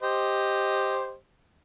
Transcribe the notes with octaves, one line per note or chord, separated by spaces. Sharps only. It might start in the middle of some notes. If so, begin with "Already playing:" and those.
G4 C5 D#5